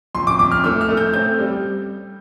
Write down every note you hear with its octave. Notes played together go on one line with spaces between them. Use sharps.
F2 C6
D6
F2 D6
F6
A3 E6
F6
A3
G6
C4 G6
G3